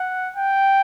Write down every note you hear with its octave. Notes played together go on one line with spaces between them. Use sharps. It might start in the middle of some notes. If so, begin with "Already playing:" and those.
Already playing: F#5
G5